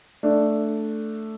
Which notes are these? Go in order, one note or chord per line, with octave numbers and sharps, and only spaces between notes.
A3 D4